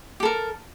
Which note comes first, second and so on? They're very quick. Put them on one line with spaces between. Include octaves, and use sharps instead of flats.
G4 A4 A#4